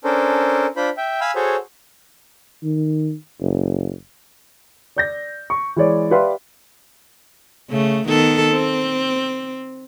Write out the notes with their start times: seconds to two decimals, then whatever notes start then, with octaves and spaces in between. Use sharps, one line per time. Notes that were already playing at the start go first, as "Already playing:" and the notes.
0.04 C#4 D4 A4 A#4 C5
0.76 D4 F4 C5 B5
0.97 E5 G5
1.21 F5 G#5 B5 E6
1.35 F#4 G#4 A4 C5 C#5
2.63 D#3
3.41 F#1
4.96 D5 G6 A#6
5.50 C#6
5.76 E3 G#3 C#5 D5
6.11 G4 B4 D5 E5 F5 C6
7.70 C#3 A3
8.07 D#3 B3 A4
8.52 C4